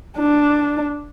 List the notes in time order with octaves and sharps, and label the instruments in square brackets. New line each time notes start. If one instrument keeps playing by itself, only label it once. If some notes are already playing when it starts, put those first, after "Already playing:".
[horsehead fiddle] D4